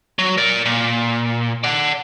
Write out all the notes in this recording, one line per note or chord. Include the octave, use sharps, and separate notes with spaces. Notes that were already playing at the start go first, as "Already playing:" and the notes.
F#3
A#4 D5
A#2
D5 F#5